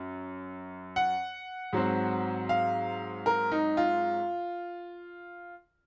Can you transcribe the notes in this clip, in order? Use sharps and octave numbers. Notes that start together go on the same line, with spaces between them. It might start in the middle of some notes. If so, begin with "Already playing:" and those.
Already playing: F#2
F#5
G#2 F#3 C4
F5
A#4
D#4
F4